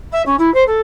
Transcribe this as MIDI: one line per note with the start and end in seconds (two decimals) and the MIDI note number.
0.12 0.22 76
0.25 0.35 61
0.38 0.52 64
0.54 0.63 72
0.67 0.80 69